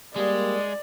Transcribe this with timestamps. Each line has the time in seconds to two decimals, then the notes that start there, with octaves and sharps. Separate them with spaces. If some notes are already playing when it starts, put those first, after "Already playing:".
0.16 G3 G#3 A#3 G#4 D5